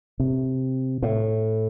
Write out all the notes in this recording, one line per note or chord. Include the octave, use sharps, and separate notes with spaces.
C3
A2